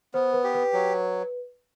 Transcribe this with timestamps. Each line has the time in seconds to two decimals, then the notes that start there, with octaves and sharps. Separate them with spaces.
0.14 B3 C5
0.33 B4
0.44 G4
0.54 B4
0.73 F#3